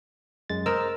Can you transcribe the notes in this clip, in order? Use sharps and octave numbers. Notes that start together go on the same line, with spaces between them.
F#2 G#3 A6
A#4 C5 D#5 E6